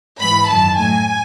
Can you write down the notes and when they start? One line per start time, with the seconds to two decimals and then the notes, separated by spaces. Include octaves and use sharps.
0.20 G#2 E3 B5
0.49 F#2 D#3 F#3 A5
0.79 A2 F#3 G#5